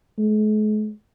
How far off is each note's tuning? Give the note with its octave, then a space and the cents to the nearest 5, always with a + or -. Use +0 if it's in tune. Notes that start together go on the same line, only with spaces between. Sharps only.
G#3 +45